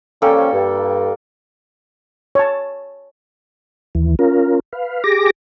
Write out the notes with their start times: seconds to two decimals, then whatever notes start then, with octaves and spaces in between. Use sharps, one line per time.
0.22 F3 G3 A#3 C#4 A4 G5
0.53 G2
2.35 C#5 A5
3.95 D#2 E3
4.19 C#4 F4 A#4
4.73 B4 F5
5.04 G4 G#4 D6 A#6